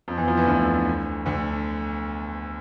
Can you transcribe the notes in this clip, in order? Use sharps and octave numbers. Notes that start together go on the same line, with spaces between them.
F2 F3
E2 E3
F2 F3
E2 E3
D2 D3
D2 D3